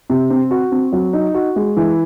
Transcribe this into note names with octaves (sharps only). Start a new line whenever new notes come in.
C3
C4
F#4
C4
F#3
D#4
F#4
G#3
E3